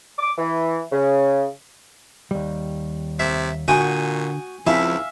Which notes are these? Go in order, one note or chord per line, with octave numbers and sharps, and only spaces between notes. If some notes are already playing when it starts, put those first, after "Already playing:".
D6
E3
C#3
D#2 G3
C3 E5
A#2 D3 F#4 G5 G#5 C#6 D#6
C#2 F3 C4 E4 E5 F5 A5